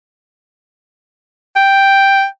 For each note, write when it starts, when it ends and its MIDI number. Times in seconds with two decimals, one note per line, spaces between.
1.56 2.26 79